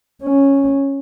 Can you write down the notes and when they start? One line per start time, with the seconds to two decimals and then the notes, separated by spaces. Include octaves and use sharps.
0.23 C#4